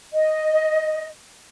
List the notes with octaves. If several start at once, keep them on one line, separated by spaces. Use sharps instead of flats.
D#5